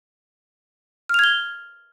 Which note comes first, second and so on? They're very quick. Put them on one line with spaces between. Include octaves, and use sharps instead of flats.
F6 F7 G#6 G7